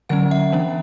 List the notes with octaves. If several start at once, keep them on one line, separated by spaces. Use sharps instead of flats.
D3 F#3 C#4 F#5
E5
E3 B3 D4